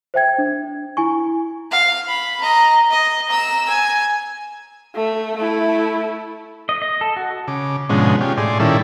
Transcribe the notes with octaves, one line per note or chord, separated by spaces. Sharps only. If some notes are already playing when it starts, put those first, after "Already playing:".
C5 E5 G5 G#6
D4
E4 G#5 C#6
F5
B5
D#5 A#5
D#5
A#5 E6
G#5
A3
A3 E4
D#5
D#5
A4
F#4
C#3 D6
G#2 B2 D3 F3 G#3 C#4
C#4 F4 G4
A2 G#4 D5 C6
A#2 D#3 G3 C#4 E4 A4